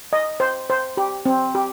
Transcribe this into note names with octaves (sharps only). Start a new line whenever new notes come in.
D#5
C5
C5
G4
C4
G4